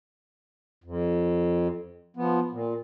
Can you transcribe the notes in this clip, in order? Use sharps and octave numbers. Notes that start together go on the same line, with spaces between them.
F2
F3 B3
A#2